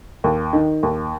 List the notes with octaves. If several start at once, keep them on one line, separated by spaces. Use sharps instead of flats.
D#2
D#3
D#2